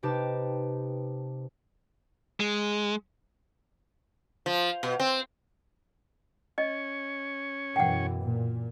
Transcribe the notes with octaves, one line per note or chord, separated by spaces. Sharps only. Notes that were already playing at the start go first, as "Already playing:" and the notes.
C3 D#4 G4 B4 A5
G#3
F3
B2
C4
C#4 C#5 D#5
F#2 B2 E3 F#5 G5
A#2